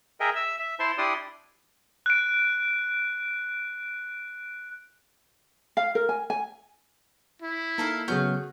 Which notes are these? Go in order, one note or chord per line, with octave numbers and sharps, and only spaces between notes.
G#4 A#4 D#5 E5 G5
E5 E6
E5
E4 C5 A5 C6
D4 E4 G4 D5 C6 D#6
F#6 D7
F5
A#4
G#5
G#5
E4
A#3 D#4 A4 F5
C#3 F#3 A3 B3 F#4 G#4 F6 G6